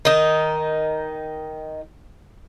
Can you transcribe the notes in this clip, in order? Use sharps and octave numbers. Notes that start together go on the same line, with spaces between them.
D#3 D#4